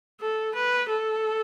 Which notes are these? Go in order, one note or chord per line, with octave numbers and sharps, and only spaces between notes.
A4
B4
A4